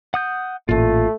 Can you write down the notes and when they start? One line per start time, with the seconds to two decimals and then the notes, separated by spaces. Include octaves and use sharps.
0.14 F#5 D#6 G6
0.69 A1 A#2 A3 F4